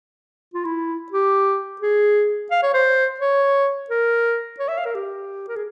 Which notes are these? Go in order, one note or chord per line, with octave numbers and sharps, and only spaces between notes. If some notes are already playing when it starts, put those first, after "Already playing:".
F4
E4
G4
G#4
F5
C#5
C5
C#5
A#4
C#5
E5
F5
A#4
G4
A#4
G#4